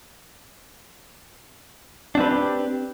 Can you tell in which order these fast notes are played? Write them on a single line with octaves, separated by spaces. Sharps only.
D4 C4 B4 G4